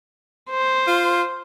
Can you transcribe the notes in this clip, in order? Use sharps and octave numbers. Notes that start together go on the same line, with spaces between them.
C5
F4